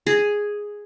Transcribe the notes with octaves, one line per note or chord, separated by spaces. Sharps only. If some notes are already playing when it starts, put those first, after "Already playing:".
G#4